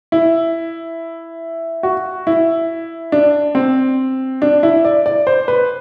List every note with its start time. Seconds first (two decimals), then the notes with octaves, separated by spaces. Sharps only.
0.12 E4
1.83 F#4
2.27 E4
3.12 D4
3.55 C4
4.42 D4
4.63 E4
4.85 D5
5.06 D5
5.27 C5
5.48 B4